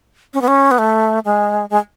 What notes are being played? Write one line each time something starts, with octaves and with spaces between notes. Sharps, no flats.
C#4
B3
C#4
B3
A3
G#3
G#3